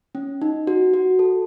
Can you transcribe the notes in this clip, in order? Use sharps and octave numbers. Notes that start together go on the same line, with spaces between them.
C#4
D#4
F#4
F#4
A4